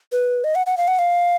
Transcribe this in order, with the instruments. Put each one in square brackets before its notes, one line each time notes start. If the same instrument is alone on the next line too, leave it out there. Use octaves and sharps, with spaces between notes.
[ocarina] B4
D#5
F#5
F#5
F5
F#5
F5